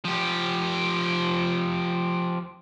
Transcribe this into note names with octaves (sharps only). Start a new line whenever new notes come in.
F3 G4